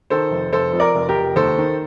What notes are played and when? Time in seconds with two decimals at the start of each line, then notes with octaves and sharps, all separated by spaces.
0.10 D#3 A4 C5
0.31 F1
0.52 F1 A4 C5
0.73 F2
0.80 A#4 D5
0.95 F1
1.09 G4 A#4
1.16 F1
1.36 D#2 A4 C5
1.58 D#3